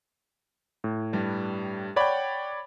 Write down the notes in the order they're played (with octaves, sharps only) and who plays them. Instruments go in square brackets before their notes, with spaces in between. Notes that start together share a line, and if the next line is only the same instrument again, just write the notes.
[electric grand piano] A2
[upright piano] G2 G3
[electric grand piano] C#5 D5 B5 [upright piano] F#5 G5